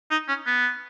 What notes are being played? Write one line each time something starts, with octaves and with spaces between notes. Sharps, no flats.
D#4
C#4
B3